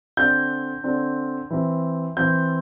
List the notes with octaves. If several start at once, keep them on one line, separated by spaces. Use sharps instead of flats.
D3 C4 G6
D3 C4
E3 C4
E3 C4 G6